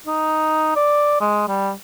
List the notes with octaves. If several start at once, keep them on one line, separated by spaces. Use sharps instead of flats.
D#4
D5
G#3
G3